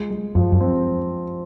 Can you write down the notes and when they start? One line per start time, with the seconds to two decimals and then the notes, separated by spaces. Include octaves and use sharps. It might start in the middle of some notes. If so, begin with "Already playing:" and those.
Already playing: G#3 F4
0.10 G#3
0.35 F#2 F3
0.52 F#2
0.61 C4